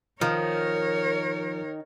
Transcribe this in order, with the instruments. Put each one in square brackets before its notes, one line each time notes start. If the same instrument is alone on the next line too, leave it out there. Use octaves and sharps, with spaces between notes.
[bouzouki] D#3 [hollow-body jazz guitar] F3 [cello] A#4 C#5